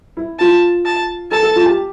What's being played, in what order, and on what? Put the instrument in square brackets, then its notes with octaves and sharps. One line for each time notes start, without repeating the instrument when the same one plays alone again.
[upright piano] E4
[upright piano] F4 [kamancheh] A5
[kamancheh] A5
[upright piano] A4 [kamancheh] A5
[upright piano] A4
F4
G4